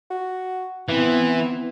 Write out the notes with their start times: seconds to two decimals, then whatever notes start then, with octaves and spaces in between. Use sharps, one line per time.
0.11 F#4
0.89 E3 B3 C4 E4 B4